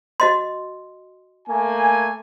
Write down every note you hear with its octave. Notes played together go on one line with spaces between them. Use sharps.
F#4 D#5 C6
A3 A#3 G#5